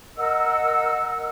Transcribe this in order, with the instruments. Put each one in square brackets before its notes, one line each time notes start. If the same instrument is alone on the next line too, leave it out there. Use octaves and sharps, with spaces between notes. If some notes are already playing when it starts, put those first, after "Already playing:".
[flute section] A#4 D#5 F#5 E6